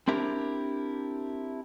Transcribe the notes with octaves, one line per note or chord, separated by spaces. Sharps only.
C4 D4 E4 G4 A#4